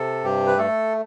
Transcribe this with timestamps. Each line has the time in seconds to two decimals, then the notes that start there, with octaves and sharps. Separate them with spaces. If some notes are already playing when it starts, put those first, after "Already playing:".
Already playing: C3 A4
0.24 G2 G4
0.47 B4
0.58 A3 A4